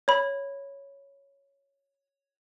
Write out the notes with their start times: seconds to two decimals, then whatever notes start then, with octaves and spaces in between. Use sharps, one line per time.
0.08 C#5 B5